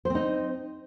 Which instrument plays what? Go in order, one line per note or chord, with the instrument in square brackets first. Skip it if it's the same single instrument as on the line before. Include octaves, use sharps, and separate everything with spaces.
[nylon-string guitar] C5
C4
D#4